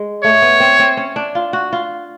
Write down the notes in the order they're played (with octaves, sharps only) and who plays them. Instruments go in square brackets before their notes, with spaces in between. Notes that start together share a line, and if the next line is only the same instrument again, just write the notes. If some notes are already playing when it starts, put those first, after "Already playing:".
Already playing: [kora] G#3
[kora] A3 [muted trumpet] C#5
[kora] B3
C4
C4
C#4
D4
F4
F#4
F4